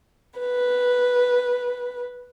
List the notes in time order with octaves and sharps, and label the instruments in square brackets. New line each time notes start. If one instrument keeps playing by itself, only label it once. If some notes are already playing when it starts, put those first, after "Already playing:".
[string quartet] B4